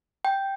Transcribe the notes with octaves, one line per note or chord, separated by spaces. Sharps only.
G5